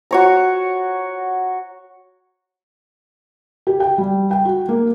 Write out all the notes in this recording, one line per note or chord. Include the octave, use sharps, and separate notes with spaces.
F#4 C#5 A#5
G4
G5
G3
G5
F#4
A#3